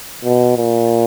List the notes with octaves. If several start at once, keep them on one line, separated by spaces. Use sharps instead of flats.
B2
A#2